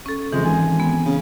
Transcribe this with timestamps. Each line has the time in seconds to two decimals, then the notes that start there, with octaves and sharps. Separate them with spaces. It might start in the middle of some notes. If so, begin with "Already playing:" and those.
0.06 C#4 A4
0.33 F2 C#3 E3 G#3
0.45 G#1 G#3 G#5
0.80 B3 C4
1.05 C#3